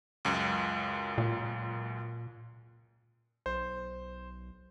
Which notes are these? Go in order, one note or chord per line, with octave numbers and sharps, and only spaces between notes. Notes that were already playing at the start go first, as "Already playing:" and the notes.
C#2 F#2
A#2
B1 C5